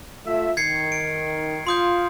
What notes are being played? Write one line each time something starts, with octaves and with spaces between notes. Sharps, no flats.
A3 F4 E5
D#3 G#6 C7 C#7
D7
F4 C6 D#6 G6